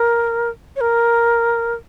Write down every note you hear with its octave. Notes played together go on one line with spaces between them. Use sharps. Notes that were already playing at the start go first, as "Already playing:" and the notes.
Already playing: A#4
C#5
A#4